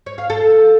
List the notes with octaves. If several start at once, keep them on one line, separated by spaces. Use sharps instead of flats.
C#5
F5
A4